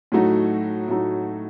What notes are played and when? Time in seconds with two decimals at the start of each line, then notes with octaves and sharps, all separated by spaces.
0.12 A2 F#3 A3 D#4 F#4
0.88 A2 F#3 A3 D#4 F#4